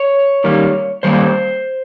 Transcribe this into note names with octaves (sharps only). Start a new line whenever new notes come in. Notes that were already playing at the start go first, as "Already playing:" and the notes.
Already playing: C#5
D#3 G3 A#3
D#3 G3 A#3 C5